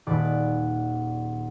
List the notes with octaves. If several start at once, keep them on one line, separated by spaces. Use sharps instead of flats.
D#1 G#4 D5 B5 D6 F#6